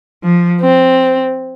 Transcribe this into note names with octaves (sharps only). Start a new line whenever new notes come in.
F3
C4